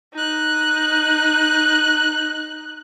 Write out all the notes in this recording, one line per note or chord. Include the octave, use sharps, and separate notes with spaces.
D#4 F#6